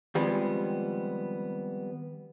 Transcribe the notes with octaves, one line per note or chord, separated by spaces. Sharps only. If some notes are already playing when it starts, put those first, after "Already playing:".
D#3 F3 G3 G#3 B3 C4